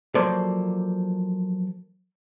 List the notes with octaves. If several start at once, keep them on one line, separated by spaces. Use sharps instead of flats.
F3 F#3 A#3 A4 C5 D5